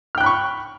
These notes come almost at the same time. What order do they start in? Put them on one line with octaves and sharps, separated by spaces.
F6 G5 F#6 B5 C#6